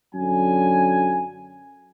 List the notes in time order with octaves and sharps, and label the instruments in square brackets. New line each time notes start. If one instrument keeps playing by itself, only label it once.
[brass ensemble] F#2 D3 F#3 G#5